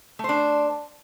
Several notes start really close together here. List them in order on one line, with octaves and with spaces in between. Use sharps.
A3 C5 D4